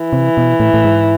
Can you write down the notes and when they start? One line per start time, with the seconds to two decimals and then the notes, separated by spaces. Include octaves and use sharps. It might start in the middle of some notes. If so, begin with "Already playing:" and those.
Already playing: E3
0.13 C3
0.37 B2
0.60 A2
0.74 A2
0.85 G#2